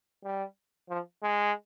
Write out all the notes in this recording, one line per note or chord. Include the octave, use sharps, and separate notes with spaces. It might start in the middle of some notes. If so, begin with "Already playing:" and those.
G3
F3
G#3